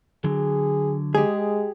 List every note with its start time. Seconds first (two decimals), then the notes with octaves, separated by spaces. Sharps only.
0.24 D3 F#3 G#4
1.15 G#3 G4 G#4